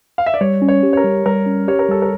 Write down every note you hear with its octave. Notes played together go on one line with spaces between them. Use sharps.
F5
E5
D5
G3 C#5
C#4
C#5
G4
C#5
A#4
G3
G3 A#4
C#4
G4 C#5
A#4
G3 A4
A#4